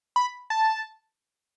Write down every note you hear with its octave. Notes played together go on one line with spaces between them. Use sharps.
B5
A5